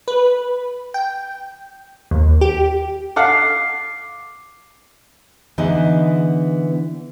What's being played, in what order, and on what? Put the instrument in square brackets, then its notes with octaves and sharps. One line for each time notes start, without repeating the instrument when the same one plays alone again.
[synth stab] B4
G5
D#2
G4
[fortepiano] A4 F5 F#5 [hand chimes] D6 C7
[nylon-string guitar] D3 E3 B3 D#4 E4 G#4